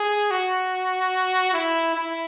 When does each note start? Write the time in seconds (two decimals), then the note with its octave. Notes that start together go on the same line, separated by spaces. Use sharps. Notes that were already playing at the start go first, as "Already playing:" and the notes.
Already playing: G#4
0.30 F#4
1.54 E4
1.94 E4